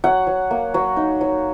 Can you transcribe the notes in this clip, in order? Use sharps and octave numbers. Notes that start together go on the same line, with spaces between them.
F#3 F#5
F#3
A#3
F#3
D#4
F#3